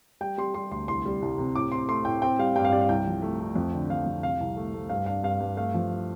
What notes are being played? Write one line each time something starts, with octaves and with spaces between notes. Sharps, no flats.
G3 G5
G3 C6
G3 C6
D2 C6
C2 C6
G3
C2
C3
A2 D6
C4 C6
A3 C6
A2 G5
C4 G5
G3 F5
G2 G5
F5
G3 D5
F5
C2 G5
F3
A3
A3
F2
D3
F2 F5
F2
C3 F5
C2
A3
A3
G2 F5
D4 F5
G2 F5
G2
A3 F5
F3